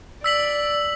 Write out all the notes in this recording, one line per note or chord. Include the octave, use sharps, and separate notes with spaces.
D5 E6 B6 F#7